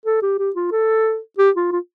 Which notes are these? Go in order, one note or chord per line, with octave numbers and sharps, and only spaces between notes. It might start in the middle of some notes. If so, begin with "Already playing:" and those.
A4
G4
G4
F4
A4
G4
F4
F4